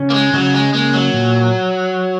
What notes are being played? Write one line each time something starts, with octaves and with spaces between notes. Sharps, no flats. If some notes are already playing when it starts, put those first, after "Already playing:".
Already playing: C#3 C#4
A#3
G#3
C#3 F#3
G#3
G#3 A#3
F#3
A#2